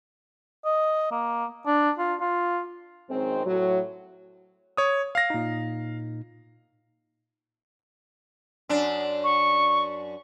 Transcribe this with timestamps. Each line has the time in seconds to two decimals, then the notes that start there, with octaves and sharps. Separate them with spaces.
0.65 D#5
1.11 A#3
1.66 D4
1.99 F4
2.21 F4
3.10 F#2 D#3 G#3 C4
3.46 A2 F#3
4.77 C#5 D#6
5.15 F5 A#6
5.30 A#2 D#4
8.69 F#2 D4
9.24 C#6